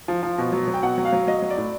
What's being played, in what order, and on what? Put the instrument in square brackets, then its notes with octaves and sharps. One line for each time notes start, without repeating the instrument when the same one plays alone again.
[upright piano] F3
F3
B2
F#3
F#3
G5
B2 F#5
F#3
F5
F#3
F#3 D#5
F#3
D5
A2